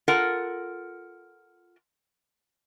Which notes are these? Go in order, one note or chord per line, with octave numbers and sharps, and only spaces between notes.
F4 A4 A#4 F#5